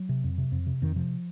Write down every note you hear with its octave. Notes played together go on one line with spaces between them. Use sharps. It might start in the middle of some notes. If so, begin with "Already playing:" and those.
Already playing: F#3
C3
F2
C3
F2
C3
F2 D#3
C3 F3